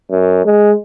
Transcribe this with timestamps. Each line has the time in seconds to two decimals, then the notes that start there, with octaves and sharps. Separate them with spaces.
0.11 F#2
0.45 G#3